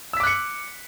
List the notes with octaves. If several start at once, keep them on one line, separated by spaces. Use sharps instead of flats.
D6 E6 F#6 B6 C#7